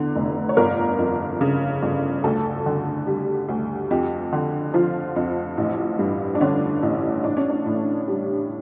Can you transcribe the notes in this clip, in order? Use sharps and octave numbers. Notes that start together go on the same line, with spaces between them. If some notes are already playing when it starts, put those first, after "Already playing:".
Already playing: E2 D3
F1
C#5
G1 A#4
F2
C#3
G1
D2 A4
D3
G3
D2
F2 G4
D3
F3 F4
F2
A1
G2
D4
D3 C#4
A1
A1 D4
C#4
D4
A2
G3